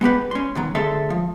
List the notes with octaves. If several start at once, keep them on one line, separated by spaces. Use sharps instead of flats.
G#3 B3 G4 B4
C#4 C6
B2 D#3 F#3
D2 G#3 A4 E5 C6
F3